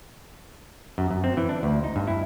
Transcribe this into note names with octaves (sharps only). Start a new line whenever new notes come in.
F#2
F#2
C4
E3
D4
D2
D#4
G2
E4